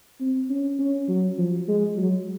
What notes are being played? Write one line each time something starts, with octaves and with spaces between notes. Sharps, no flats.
C4
C#4
C#4
F#3
F3
G#3
F#3